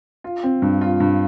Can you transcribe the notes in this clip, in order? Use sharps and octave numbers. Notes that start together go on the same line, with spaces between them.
F4
C4
G2
F4
G2